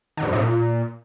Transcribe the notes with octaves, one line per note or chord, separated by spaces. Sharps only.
D#3
G#2
F#2
A2
A#2